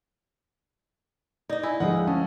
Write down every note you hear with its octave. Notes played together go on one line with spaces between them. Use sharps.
D#4 D5 D#5
E4 G#5
D2 F3 G3 G#3 G#4 D#5 F#5
C#4 A5 D#6